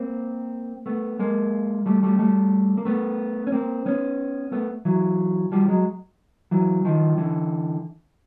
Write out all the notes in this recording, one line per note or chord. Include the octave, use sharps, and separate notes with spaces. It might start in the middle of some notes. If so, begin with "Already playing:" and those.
Already playing: A#3 C4
A3 B3
G#3 A#3
G3 A3
G3 A3
G3 A3
A#3
A3 B3
C#4
A#3 C4
B3 C#4
A3 B3
E3 F#3
F3 G3
F#3 G#3
E3 F#3
D#3 F3
D3 E3